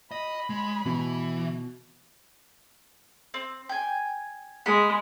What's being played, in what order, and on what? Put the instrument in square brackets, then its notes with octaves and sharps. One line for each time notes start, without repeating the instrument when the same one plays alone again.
[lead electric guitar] D#5 [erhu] B5
[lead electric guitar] G#3
[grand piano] B2 [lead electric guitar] E3
[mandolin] C4
G5 G#5
[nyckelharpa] G#3 [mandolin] B5